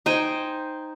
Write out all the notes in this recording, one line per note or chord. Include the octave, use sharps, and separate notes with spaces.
D#4 C5 G5 G#5